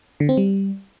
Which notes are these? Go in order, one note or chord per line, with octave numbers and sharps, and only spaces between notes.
D3
C4
G3